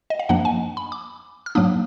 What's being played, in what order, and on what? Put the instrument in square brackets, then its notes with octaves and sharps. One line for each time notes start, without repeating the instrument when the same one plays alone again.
[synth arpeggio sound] D#5
F5
F#2 F3 A#3 D4 F#5
G#5
B5
D6
F6
G#2 F#3 A#3 D4 D#6